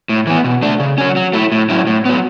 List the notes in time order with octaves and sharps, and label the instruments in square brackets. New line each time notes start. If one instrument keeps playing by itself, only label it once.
[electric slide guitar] A2
E3 B3
B2
A3 D4
C#3
F#3 C#4
F#3
A3 E4
A2
F#3 C#4 E4
A2
F#3 B3